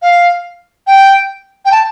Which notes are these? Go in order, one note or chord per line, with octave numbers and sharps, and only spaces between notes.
F5
G5
G5
A5